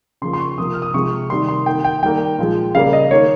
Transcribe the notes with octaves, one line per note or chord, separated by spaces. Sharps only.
C#3 F3 A#3 C6
C6
C#6
C3 F3 A#3 D#6
F6
D#6
C3 F3 G#3 C#6
C3 D#3 G3 A#3 C6
C6
D#3 A#3 G5
G5
D#3 G3 A#3 G5
A#2 F3 G#3
C#3 G3 A#3 F5
D#5
D#3 A#3 C#5